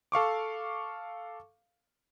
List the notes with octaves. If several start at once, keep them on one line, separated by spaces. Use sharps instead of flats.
A4 F5 C#6 D6